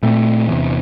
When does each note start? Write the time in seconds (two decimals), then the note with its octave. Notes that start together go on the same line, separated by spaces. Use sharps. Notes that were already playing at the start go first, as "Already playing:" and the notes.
0.03 A#2 A3 C4
0.48 E2 C3 E3